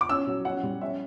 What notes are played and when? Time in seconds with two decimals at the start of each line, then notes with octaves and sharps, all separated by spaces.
0.01 D6
0.09 C#4 E6
0.27 F#3
0.45 C#4 F#5
0.63 G3
0.81 C#4 E5